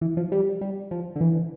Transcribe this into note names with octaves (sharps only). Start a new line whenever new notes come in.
E3
F3
G3
G3
F3
D3
E3